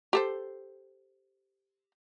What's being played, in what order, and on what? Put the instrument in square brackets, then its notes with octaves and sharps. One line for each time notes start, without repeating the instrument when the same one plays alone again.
[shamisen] G4 A4 C5